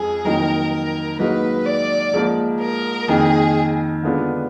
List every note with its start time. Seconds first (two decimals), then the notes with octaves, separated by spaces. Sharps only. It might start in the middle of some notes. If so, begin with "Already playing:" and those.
Already playing: F2 F3 G#3 G#4
0.25 F2 D#3 F#3 A#3 D#4 A#4
0.72 A#4
1.19 G#2 F#3 A#3 D#4 B4
1.66 D5
2.13 G#2 F3 A#3
2.61 A#4
3.08 F2 D#3 A#3 D#4 G#4
4.03 D3 G#3 B3 D4 F4